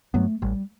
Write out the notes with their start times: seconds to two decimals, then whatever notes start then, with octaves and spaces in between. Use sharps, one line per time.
0.14 G2 F#3 A3 B3
0.42 A1 G3